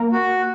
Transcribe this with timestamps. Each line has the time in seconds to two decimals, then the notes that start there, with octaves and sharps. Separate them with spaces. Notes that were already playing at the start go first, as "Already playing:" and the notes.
Already playing: A#3 A#4
0.12 F#4